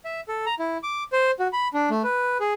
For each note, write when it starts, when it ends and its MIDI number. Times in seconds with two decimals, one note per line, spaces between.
0.05 0.21 76
0.28 0.45 69
0.46 0.55 82
0.59 0.78 64
0.83 1.04 86
1.13 1.31 72
1.40 1.48 66
1.53 1.68 83
1.74 1.89 62
1.90 2.02 57
2.04 2.38 71
2.40 2.53 68